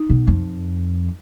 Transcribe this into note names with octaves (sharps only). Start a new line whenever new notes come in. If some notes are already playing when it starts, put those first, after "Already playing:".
Already playing: D#4
B2
F2